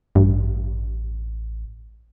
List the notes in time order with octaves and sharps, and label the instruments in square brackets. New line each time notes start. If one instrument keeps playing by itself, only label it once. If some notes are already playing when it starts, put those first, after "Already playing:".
[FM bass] A1 [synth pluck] G2